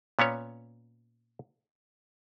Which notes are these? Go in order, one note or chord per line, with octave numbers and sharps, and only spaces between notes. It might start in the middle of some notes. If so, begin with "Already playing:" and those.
A#2 B3 C#4 C#5